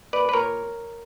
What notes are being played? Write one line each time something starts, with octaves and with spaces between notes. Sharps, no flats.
A#2 B4 D5
B4
A#2 A#4 C#5